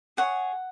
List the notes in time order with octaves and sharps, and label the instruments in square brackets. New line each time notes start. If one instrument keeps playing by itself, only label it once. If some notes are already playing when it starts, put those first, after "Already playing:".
[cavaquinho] G#4 C#5 F#5